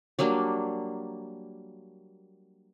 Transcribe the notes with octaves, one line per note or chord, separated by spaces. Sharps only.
F#3 G3 A#3 D4